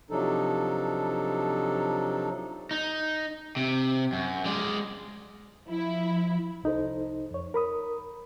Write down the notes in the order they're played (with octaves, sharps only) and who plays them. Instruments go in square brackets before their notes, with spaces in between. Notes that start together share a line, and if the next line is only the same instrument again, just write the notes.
[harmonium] C3 F3 F#3 D4 D#4 A4
[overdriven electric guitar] D#4
C3
F#2
G#3 D5
[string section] F3 E4
[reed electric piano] C2 D#4 A4 C5
F2 C#5
A#4 B5 D#6